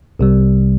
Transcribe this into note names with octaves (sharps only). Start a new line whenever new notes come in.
C2 C3 G3